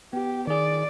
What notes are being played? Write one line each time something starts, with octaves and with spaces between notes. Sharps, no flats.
B3 G4
D#3 G#4 D5